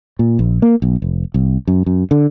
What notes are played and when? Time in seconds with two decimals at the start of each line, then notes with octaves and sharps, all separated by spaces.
0.19 A#2
0.39 A#1
0.62 A#3
0.82 B1
1.02 F1
1.34 C2
1.68 F#2
1.86 F#2
2.11 D3